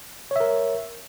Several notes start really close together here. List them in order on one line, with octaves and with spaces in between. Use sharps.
C#5 E5 A#4